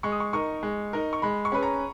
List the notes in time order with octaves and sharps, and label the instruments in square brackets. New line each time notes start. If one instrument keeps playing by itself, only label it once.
[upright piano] G#3 [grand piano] C#6
[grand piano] D#6
C#6
[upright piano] D#4 A#4 [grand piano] C#6
[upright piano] G#3
D#4 A#4
[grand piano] C#6
[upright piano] G#3 [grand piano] B5
[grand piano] C#6
[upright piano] C#4 G#4 B4 [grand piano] B5
[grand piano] A#5